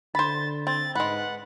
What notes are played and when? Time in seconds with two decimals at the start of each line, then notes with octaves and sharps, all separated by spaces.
0.15 D3 C5 B5 A6
0.67 C4 A6
0.95 G#2 G#3 B4 F#5